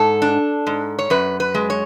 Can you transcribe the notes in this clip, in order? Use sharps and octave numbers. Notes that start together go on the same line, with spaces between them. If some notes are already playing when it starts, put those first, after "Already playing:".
Already playing: G#2 A4
D4
G#2
C#5
F#2 B4
B4
G#3
C#5